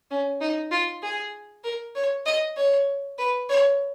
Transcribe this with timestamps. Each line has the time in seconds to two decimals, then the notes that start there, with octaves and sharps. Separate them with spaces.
0.11 C#4
0.41 D#4
0.71 F4
1.02 G#4
1.64 A#4
1.95 C#5
2.26 D#5
2.56 C#5
3.18 B4
3.49 C#5